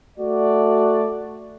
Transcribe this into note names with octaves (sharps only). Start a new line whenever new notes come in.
A3 F#4 D5